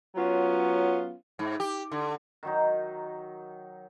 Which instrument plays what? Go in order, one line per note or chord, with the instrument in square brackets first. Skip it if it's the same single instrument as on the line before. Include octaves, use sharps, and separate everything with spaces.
[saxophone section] F#3 B3 C#4 F4
[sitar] G#2
G4
D3
[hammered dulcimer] D#3 F#3 D#4